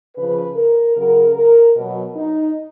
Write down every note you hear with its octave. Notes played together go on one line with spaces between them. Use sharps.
C#3 F3 B4
A#4
C#3 F#3 A#4
A#4
B2 F#3
D#4